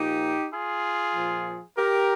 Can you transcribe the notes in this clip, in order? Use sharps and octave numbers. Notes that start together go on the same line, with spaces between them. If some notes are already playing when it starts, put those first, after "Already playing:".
Already playing: A#2 F3 D#4 G4
F4 G#4
A#2 F3
G4 A#4